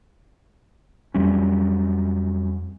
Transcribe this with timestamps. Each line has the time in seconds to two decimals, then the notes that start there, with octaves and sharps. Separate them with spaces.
1.14 F2 F#3 G3 C#4